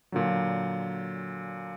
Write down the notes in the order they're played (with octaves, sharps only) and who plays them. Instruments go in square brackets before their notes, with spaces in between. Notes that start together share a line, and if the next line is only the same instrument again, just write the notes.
[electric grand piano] A#2 D3 F#3